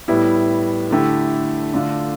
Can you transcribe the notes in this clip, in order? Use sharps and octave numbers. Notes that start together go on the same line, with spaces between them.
A2 G3 B3 E4
D3 A3 E4 G4
D3 A3 D4 F4